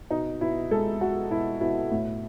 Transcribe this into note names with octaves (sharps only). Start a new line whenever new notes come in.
B2 D#4
B2 E4
G#3 A4
G#3 F#4
B2 E4
B2 E4
A2